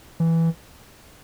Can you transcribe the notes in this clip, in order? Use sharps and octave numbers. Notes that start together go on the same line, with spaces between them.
E3